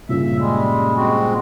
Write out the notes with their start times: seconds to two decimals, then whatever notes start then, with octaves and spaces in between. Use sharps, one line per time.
0.09 G2 A#2 C#3 E5
0.38 G3 G#3
0.96 G#3 C4 F#4